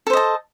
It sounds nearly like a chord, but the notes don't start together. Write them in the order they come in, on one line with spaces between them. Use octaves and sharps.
A4 C5 D#5 A5